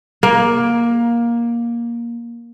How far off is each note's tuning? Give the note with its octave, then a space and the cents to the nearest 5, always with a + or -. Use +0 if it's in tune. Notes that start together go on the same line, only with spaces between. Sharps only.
A#3 +15